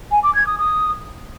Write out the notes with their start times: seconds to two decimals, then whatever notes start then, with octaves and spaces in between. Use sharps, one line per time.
0.11 G#5
0.23 D6
0.35 G#6
0.47 D#6
0.59 D#6